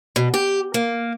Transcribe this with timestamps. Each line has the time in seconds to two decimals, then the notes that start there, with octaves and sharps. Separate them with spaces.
0.16 B2
0.34 G4
0.74 A#3